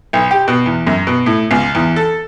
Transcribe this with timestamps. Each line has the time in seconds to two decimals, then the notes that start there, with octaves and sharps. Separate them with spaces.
0.13 B1
0.31 G4
0.48 B2
0.66 E2
0.87 F#2
1.07 B2
1.26 A2
1.51 C#2
1.75 E2
1.96 A4